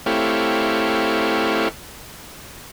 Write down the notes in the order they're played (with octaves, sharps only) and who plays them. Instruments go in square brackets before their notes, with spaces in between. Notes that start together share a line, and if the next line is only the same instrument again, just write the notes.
[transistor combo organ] A3 C4 E4 G4 C#5 F5